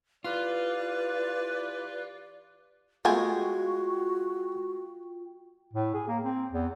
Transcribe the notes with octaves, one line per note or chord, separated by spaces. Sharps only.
E3 F4 G4 B4 D5
G#3 A3 B3 F4 F#4 G5 G#5
A2
G#4
A#3
C4
E2